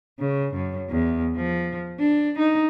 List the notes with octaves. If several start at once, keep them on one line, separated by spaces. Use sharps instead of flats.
C#3
F#2
E2
F3
D4
D#4